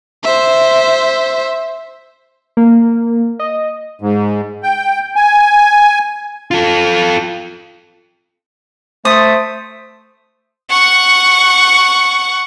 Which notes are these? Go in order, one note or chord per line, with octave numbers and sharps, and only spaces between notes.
C5 E5
A#3
D#5
G#2
G5
G#5
F4 A4
A3 C5 D#6
F#5 C#6